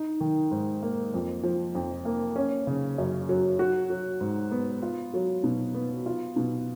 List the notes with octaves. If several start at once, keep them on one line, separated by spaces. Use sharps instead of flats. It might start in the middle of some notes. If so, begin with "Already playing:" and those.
Already playing: D#4
D#3
G#2
A#3
F2
F3
F2
A#3
C#4
C#3
F#2
F#3
F#4
F#3
G#2
B3
F4
F#3
B2
B3
F4
B2